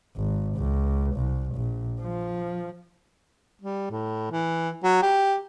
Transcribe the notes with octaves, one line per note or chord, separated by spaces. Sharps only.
G#1
C#2
C2
A#1
F3
G3
A2
E3
F#3
G4